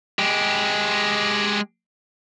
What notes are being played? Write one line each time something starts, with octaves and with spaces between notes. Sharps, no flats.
G#3 G4